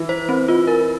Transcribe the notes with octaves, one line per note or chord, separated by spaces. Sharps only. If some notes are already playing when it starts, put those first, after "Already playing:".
Already playing: E3
C5
C4
F4
A#4